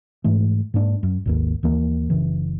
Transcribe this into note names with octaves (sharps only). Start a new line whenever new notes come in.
G#2 E3 A3
G#2 A#3 D4
F#2
G#1 D#2 A#3
D#2 E3 A#3
F#1 C#3 E3